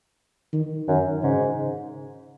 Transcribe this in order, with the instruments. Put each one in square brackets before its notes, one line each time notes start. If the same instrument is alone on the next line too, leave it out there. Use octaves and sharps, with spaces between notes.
[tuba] D#3
[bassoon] F#2 [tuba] D#3
[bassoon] G#2 [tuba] C#3